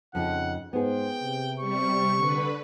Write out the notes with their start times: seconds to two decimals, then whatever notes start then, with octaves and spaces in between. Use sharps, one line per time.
0.15 F2 C#3 D#4 F4 F#5
0.73 G#2 B3 G#4 C5 G5
1.22 C3
1.60 G3 C#6
2.17 D3 B4